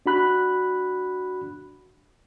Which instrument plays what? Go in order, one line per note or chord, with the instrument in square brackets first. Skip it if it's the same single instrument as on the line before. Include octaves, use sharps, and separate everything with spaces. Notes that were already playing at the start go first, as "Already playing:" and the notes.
[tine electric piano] D4 F#4 B5 F#6